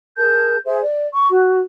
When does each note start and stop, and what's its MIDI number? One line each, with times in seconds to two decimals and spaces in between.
0.17 0.55 68
0.17 0.55 70
0.17 0.55 81
0.17 0.55 91
0.65 0.78 68
0.65 0.78 72
0.65 0.78 76
0.82 1.06 74
1.13 1.27 85
1.30 1.60 66